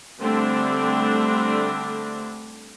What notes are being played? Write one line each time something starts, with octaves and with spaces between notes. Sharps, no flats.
D3 G3 A3 C4 D4